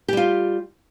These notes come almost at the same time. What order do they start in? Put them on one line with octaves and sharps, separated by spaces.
G4 G3 F4